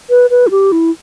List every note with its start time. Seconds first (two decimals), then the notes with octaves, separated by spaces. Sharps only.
0.10 B4
0.30 B4
0.47 E4
0.51 G4
0.72 E4